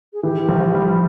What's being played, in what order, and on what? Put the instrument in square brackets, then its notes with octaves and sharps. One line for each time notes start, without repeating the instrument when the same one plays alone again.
[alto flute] G#4
[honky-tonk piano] E3 [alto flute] G4
[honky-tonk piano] A#1
G3